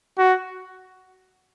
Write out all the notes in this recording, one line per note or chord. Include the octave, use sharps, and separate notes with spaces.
F#4